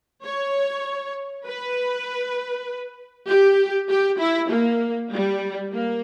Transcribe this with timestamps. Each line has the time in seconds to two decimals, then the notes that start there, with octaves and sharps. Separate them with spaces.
0.23 C#5
1.45 B4
3.28 G4
3.89 G4
4.19 E4
4.50 A#3
5.11 G3
5.72 A#3